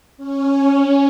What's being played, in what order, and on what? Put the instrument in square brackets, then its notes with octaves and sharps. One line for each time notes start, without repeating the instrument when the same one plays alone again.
[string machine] C#4